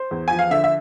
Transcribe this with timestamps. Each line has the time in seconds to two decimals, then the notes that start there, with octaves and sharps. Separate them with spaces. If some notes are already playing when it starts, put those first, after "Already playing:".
Already playing: C5
0.11 E2
0.28 F3 G#5
0.39 F5
0.51 D3 E5
0.64 E5